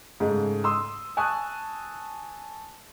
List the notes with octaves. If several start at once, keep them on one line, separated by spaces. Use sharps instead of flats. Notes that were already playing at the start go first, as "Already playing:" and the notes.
G#2 C#3 G#3 A3
C6 D#6 E6
G#5 A5 C#6 D#6 F#6